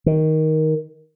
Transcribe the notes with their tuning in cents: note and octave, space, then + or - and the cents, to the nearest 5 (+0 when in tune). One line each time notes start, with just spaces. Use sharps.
D#3 +10